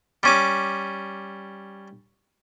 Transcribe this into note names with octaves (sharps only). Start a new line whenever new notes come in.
G3 C#4 D6